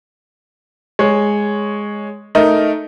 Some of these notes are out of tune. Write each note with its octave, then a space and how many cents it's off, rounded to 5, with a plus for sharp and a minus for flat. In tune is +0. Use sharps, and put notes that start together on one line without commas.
G#3 +0 C#5 +0
A3 +0 D#4 +0 A#4 +0